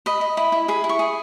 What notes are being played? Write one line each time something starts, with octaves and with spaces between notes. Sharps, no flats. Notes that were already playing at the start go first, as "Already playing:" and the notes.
D#5 B5
D#5
E4 B5
E4
G#4 B5
E4
C#6
G#4